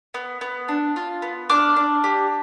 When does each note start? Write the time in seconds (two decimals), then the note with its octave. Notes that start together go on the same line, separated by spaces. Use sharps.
0.14 B3
0.41 B3
0.68 D4
0.96 F4
1.22 B3
1.50 D4 D6 F6
1.76 D4
2.04 G4